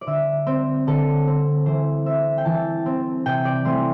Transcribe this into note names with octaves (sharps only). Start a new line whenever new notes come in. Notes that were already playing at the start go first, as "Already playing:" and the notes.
D5
D3 E5
C4
D3 A4
C4
E3 C5
C4 E5
G5
E3 A5
C4
C3 G5
D5
E3 A3 C4 C6